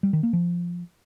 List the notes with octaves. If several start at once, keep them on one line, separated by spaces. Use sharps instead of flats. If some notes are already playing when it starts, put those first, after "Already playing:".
G3
D#3
A#3
F3